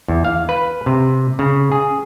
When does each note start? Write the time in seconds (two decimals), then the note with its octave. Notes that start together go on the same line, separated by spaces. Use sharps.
0.08 E2
0.24 F5
0.49 B4
0.86 C3
1.39 C#3
1.72 G#4